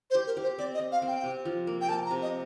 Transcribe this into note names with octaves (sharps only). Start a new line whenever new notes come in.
C5
G4
A#4
G4
C5
C4 D5
D#5
C4
F5
C4
G5
C3
F3
A#3
G5
A#3 A5
A#5
C3
D#5